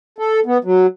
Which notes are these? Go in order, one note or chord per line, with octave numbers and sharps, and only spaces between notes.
A4
B3
F#3